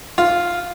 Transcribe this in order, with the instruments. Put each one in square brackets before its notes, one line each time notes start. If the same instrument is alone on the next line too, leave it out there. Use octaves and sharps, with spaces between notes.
[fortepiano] F4